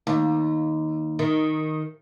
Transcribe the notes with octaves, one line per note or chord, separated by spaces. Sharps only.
D#2
D#3